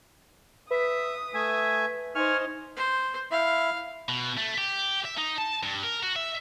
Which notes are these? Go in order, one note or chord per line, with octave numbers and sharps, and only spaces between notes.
B4 E5 D#6 B6
A3 E5 G#5
D#4 C5 G#5 C#6 F6
C5
E4 E5 F5
B2
A3
G4
E5
D#4
A5
G2
A#4
F#4
E5